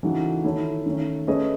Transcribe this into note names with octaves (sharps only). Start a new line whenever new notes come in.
C#3 E3 A3 D#4 F#4
D#3 A3 E4 A4 C#5
D#3 A3 C#4
A3 C#4 G#4 B4 D#5